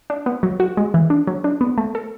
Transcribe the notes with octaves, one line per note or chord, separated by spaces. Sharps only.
D4
B3
F#3
F#4
G#3
E3
D4
F#3
D4
B3
A3
A4